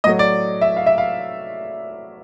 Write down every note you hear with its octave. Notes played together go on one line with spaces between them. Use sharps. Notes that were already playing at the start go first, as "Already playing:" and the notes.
A2 F#3 A3 D#5
D5
E5
F5
E5
F5